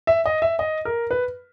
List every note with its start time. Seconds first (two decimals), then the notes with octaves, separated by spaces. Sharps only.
0.07 E5
0.26 D#5
0.42 E5
0.59 D#5
0.85 A#4
1.11 B4